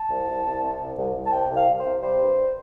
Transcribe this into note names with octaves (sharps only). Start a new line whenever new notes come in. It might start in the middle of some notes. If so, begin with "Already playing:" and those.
Already playing: A5
C2
C2
C2
C3
C2
C2
C2
A5
C3 G5
C2
F5
C2
C5
C3
G3 C5
G2